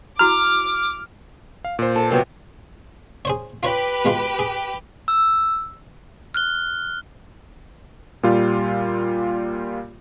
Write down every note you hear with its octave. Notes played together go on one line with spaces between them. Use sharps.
E4 F#4 A#5 D6 F6
F5
A#2 C5
A4
C3 F#3 B3
G#4 C5 C#5
F4 G4 B4 C#5
B2 G#3 F4
G#4
E6
F6 F#6 G7
A#2 G3 F4